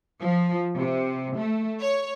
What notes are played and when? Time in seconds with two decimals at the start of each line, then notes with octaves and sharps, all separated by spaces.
0.22 F3
0.77 C3
1.37 A3
1.81 C#5